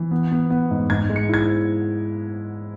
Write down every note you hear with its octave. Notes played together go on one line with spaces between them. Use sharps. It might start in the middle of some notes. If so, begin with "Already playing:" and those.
Already playing: E3
B3
B3
B3
G#2
G#2 G#6
G#3
C#7
E4 G#6